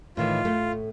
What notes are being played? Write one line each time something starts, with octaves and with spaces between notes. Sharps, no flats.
A2 D#3 E3 F4
A2 A3